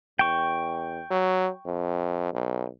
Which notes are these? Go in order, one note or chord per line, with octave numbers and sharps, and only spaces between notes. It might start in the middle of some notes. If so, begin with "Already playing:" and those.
E2 G5 C#6
F#3
F2
B1